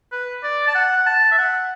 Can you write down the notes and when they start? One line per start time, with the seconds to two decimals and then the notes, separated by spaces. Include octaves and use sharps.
0.12 B4
0.43 D5
0.67 A5
0.75 F#5
0.98 F#5
1.06 A5
1.31 E5
1.38 F#5